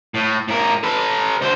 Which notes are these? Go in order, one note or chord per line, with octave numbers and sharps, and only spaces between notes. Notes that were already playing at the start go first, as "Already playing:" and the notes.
A2
A2 A#4
A4 B4
D3 C5